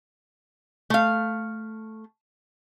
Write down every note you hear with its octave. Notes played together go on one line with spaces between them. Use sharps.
A3 F5